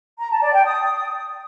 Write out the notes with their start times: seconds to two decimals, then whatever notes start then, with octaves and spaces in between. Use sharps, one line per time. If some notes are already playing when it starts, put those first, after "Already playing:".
0.19 A#5
0.30 A5
0.42 D5
0.53 G5
0.65 D#6